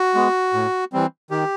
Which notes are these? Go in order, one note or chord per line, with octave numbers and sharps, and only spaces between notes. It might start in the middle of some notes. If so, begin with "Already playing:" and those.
Already playing: F#4
G#3 B3
A2
E3 G3 C4
D#3 G4